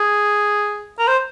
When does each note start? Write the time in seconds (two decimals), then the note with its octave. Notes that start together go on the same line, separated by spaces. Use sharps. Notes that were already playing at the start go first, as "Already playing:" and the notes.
Already playing: G#4
0.99 A#4
1.08 C5